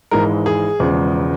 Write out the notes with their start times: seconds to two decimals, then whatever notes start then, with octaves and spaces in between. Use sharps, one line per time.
0.11 G#1 G#2 E3 G#3 A#4
0.46 G#4
0.79 E1 E2 C#3 F3 G#3